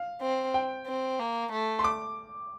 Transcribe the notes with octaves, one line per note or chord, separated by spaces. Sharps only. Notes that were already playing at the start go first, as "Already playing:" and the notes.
Already playing: F5
C4
G5
C4
A#3
A3
C6
D6